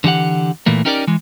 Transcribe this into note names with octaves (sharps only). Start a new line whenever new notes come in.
D3 E3 G4 F#5
A#2 E3 A3 A#3
C#4 D#4 G4 A#4 C5 D5
E3 G#3